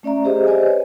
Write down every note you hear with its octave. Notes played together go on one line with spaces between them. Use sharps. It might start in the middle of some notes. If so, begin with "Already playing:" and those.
A3 C#4 D5 E5 A#5
G4 G#4 C5 D#5 E5
G4 C5 D5 D#5 G#5
B4 C#5